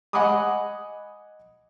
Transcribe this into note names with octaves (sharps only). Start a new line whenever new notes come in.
D#5 F#5 G#5 B5 D6 D#6